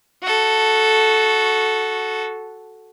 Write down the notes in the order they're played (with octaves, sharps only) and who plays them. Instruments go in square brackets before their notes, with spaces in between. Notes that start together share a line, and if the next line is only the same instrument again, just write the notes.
[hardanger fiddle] F#4 A4